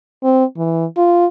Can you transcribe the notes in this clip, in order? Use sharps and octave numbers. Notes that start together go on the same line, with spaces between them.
C4
E3
F4